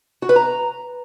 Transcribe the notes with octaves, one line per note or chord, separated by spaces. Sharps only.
F#4
B4
A#5